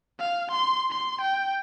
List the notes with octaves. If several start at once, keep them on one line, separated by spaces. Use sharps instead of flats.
F5
C6
C6
G5